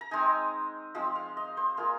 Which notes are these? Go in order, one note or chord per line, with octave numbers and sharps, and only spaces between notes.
A#5
G#3 C4 D#4 G#5
F3 G#3 C4
F5
D#5
C5
A#3 F4 G#4